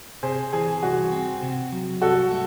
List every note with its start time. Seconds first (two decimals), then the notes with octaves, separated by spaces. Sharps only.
0.23 C3 G#4 C5
0.53 E3 G#4
0.83 C2 F#4
1.12 C4
1.43 C3
1.72 F#3
2.02 C2 F#4 A4
2.31 A3